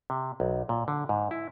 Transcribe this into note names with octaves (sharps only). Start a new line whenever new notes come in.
C3
B1
A#2
D3
G#2
E4